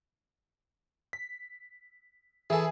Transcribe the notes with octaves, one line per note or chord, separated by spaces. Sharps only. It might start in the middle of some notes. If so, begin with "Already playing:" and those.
B6
E3 G#4 A4 E5 G#5